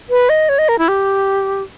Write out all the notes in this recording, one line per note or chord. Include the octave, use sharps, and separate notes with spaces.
B4
D#5
C#5
D#5
A#4
E4
G4